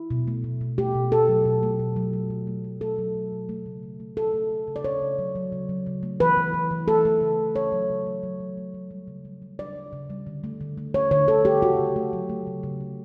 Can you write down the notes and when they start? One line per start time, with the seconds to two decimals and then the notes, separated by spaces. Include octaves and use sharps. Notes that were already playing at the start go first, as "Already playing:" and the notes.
Already playing: E4
0.11 B2
0.27 A3
0.44 B2
0.61 B2
0.78 A3 G4
0.95 B2
1.12 B2 A4
1.28 F#3
1.45 B2
1.63 A3
1.80 B2
1.96 F#3
2.13 F#3
2.30 B2
2.47 A3
2.64 A3
2.81 A3 A4
2.98 F#3
3.15 B2
3.32 B2
3.49 A3
3.66 C#3
3.83 C#3
4.00 A3
4.17 C#3 A4
4.34 A3
4.51 A3
4.68 C#3
4.76 D5
4.85 C#3 C#5
5.01 C#3
5.19 F#3
5.36 F#3
5.52 C#3
5.69 F#3
5.86 C#3
6.03 A3
6.20 E3 B4
6.37 E3
6.54 E3
6.71 E3
6.88 A3 A4
7.05 A3
7.21 C#3
7.39 E3
7.56 C#3 C#5
7.72 F#3
7.89 C#3
8.06 A3
8.23 F#3
8.40 F#3
8.57 A3
8.74 F#3
8.91 G3
9.08 C#3
9.25 G3
9.42 G3
9.59 C#3 D5
9.76 C#3
9.93 C#3
10.10 G3
10.27 D3
10.44 A3
10.61 D3
10.78 A3
10.94 A3 C#5
11.11 D3 C#5
11.28 D3 A4
11.45 A3 G4
11.62 C#3 F#4
11.79 C#3
11.96 A3
12.13 F#3
12.29 A3
12.47 C#3
12.63 C#3
12.81 C#3